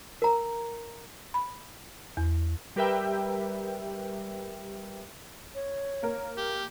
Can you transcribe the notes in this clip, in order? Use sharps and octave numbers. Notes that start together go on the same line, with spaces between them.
A#4 A#5
B5
E2
G3 G4 A#4 B4 E5 G5
C#5
A#3 A#4
G4